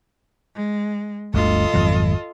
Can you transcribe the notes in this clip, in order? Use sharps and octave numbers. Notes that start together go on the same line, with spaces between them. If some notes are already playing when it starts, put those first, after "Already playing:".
G#3
G1 D2 F4 A4 D#5
G#1 F2 F#3